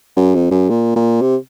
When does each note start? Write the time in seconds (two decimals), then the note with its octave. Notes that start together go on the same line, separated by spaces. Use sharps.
0.17 F#2
0.35 F2
0.51 F#2
0.70 A#2
0.96 A#2
1.22 C3